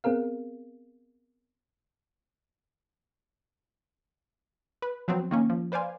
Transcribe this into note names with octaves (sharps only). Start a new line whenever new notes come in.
B3 C4 G#4 A#4 F5
B4
F3 F#3 B3 C4
D#3 A#3 C#4
F3
B4 C5 D5 F5 G#5